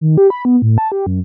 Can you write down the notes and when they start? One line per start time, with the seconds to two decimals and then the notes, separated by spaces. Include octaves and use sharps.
0.01 D#3
0.18 G4
0.30 B5
0.45 B3
0.62 A2
0.78 A5
0.92 G4
1.06 F#2